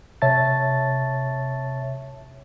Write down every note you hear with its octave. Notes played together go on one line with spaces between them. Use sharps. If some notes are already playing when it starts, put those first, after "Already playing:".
C3 C#5 E5 A5 A6